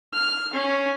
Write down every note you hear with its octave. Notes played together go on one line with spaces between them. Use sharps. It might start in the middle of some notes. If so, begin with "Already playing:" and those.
F6
C#4